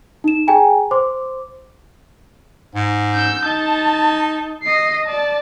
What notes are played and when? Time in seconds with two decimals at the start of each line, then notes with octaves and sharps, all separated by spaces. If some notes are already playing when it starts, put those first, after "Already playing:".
0.24 D#4 E7
0.47 G#4 G5 G#5 A#5
0.91 C5 C6 D6
2.75 G#2
3.14 E6 G6
3.46 D#4 A5
4.63 D#5 C7
5.07 D5 A5